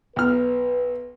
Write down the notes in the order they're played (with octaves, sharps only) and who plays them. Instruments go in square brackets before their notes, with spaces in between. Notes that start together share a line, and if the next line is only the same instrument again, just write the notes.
[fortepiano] B1 F6 [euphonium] B4